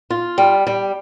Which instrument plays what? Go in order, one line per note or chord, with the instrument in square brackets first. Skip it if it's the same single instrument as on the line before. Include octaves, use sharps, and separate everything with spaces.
[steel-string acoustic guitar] F4
G3
G3